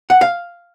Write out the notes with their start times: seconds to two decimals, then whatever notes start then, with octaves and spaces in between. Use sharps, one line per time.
0.10 F#5
0.21 F5